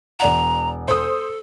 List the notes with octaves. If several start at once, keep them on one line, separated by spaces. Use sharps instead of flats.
E1 D5 F#5 A#5
A4 C5 D#6